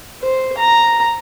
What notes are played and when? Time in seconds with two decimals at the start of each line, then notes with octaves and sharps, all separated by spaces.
0.22 C5
0.58 A#5